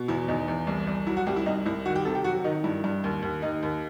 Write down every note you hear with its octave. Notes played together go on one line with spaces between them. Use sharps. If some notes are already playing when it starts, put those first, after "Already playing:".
Already playing: B2
E2 E4
E2 D#4
E2
C2
C2
F#3 E4
F#4
C2 G4
E4
C2 D#4
C2 E4
D#3 F#4
G4
C3 A4
G4
F#3 F#4
D#3 D#4
G2 E4
G2
D#2
D#2
D#2 D#4
D#2